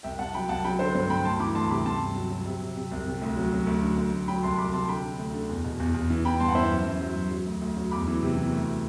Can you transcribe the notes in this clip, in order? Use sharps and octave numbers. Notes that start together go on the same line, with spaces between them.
C2 E5 G5
C2 F#5 A5
F#3 G5 B5
C2 F#5 A5
F#3 G5 B5
D3 C5
G2 C5
G2 G5 B5
D2 A5 C6
E3 B5 D6
D2 A5 C6
C3 B5 D6
G2 A5 C6
G2
F#3
F#3
C3
C3
C3
C2
C3
D2
F#3
F#3
D2
D3
D2
D2
F#3 G5 B5
C2 A5 C6
C2 B5 D6
C3 A5 C6
D3 G5 B5
D3
D2
D3
E2
B2
E2
E2
E3
E3 G5 B5
G2 A5 C6
F#5
E3 C5 E5
F#2
F#2
F#3
F#2
F#3
D2
D2
F#3
E2 B5 D6
E3
C3
E3
D2